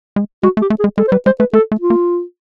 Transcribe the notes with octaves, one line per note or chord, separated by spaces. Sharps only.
G#3
G#3 F#4
A3
G4
A3
G#4
G#3
G#3 A4
C5
G3 B4
G#3 C5
A3 B4
A3 A4
A3
F4
A#3